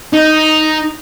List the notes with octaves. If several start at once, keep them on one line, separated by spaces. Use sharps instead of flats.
D#4